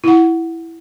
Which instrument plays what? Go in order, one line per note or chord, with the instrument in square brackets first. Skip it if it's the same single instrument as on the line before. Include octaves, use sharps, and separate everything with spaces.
[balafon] E4 F#5